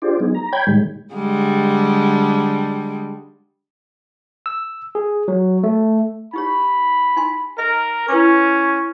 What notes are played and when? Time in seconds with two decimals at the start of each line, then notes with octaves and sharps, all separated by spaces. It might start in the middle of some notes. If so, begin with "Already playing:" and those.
0.02 D4 F4 G4 G#4 C5 D5
0.20 F#3 B3 D#4 G#4
0.35 A#5
0.52 C#5 G5 B5 G6 G#6
0.67 A2 D#3 G3 G#3
1.13 D3 G3 G#3
4.46 E6
4.95 G#4
5.28 F#3
5.63 A3
6.33 D#4 G4 C#5 B5
7.16 D#4 G#5 C6
7.58 A#4 D#5
8.08 C#4 E4 B4 D6